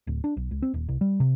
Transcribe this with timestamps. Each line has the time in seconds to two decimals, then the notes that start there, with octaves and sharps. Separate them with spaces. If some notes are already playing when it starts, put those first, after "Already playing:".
0.07 D1
0.24 D4
0.37 B1
0.51 C#2
0.62 C4
0.74 D#1
0.88 C2
1.01 G3
1.20 C3